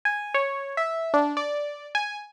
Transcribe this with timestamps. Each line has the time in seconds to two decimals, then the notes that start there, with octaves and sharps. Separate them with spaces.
0.05 G#5
0.34 C#5
0.77 E5
1.14 D4
1.37 D5
1.95 G#5